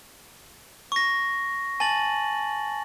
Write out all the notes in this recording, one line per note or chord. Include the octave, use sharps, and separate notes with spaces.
C#6 A#6
G#5 A5 A6 F#7